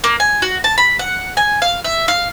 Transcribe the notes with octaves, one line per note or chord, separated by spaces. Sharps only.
A#3
G#5
F#4
A5
B5
F#5
G#5
F5
E5
F5